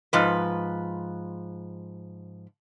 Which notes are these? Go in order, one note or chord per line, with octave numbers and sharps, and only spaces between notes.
G#2 F3 B4